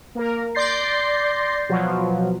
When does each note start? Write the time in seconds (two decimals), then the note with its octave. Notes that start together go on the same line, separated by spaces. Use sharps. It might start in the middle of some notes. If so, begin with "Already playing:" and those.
0.15 A#3 A#4
0.55 D5 C6 G6 A6 A#6 C7
1.69 B2 F3 F#3